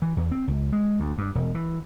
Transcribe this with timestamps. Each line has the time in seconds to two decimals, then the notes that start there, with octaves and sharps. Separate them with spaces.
0.02 E3
0.17 E2
0.31 C4
0.48 C#2
0.72 G#3
1.00 D2
1.18 G2
1.35 E1
1.55 E3